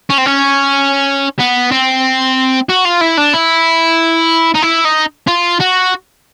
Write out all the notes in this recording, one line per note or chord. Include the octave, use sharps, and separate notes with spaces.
C#4
C4
C#4
B3
C4
F#4
F4
E4
D4
E4
D#4
E4
D#4
F4
F#4